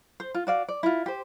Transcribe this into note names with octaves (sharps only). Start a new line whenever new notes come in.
C5
F4
F#4 D5 F5
D5
E4 F4
G4 C5